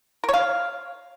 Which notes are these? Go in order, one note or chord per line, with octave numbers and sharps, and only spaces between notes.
A#4
C#5
F5